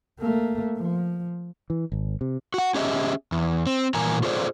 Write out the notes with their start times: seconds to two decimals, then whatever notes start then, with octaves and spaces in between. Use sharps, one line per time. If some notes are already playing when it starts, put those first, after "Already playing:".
0.20 A3 A#3
0.77 F3
1.70 E3
1.92 G#1
2.21 C3
2.54 F#4 F#5
2.75 C#4 G4 G#4 D#5 E5
3.32 E2
3.67 C4
3.94 A#2 E3 A#4 G#5 A#5
4.23 F4 G#4 A4 C5 D5